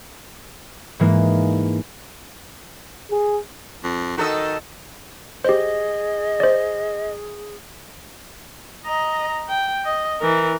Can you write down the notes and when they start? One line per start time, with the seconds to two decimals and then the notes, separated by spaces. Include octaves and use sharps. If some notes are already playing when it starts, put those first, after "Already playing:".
0.99 G#2 E3 G#3 A#3
3.11 G#4
3.84 F2
4.17 D#3 F#4 A4 D#5
5.44 G4 G#4 C5 D#5
6.40 C5 D5
8.85 D#5 A#5
9.49 G5
9.85 D#5
10.20 E3 A#4